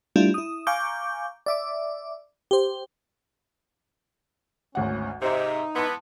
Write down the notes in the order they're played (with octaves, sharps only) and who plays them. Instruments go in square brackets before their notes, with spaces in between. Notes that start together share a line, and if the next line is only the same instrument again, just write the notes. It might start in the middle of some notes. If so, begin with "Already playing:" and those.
[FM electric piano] G3 A3 D4 E4 F4
E4 D#6
F5 G#5 A#5 C#6 D6 G6
D5 E5 D6
G4 C5
[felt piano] G#1 D2 F#5 [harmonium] C#4
[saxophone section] G#2 C3 [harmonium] D#4 [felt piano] C5 E5
[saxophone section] E3 B3 [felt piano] A5 C6